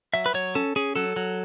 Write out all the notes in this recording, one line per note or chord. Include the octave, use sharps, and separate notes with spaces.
F#3 E5
B4
F#3 C#5
C#4 A4
C#4 G#4
F#3 A4
F#3